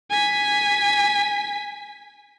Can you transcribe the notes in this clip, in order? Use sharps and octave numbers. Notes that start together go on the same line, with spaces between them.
G#5 B6